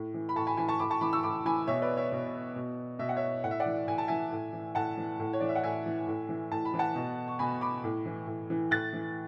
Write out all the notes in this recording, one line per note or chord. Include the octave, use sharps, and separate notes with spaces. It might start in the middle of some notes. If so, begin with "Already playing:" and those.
Already playing: A2
E3
B5
A2 A5 C#6
G#5 B5
E3 G#5 B5
A5 C#6
A2 B5 D6
A5 C#6
E3 B5 D6
C#6 E6
A2 B5 D6
E3 G#5 B5
B2 C#5 E5
B4 D5
C#5 E5
B2
B2
B2 E5
F#5
C#5 E5
A2 F#5
E5
D5 F#5
E3
A2 G#5
A5
E3 E5 G#5
A2
E3
A2 F#5 A5
E3
A2
C#5
E3 D5
E5
F#5
A2 E5 G#5
E3
A2
E3
A2 A5
B5
E3
F#5 A5
B2
C#6
B2 G#5 B5
B5 D6
A2
E3
A2
E3
A2 F#6 A6
E3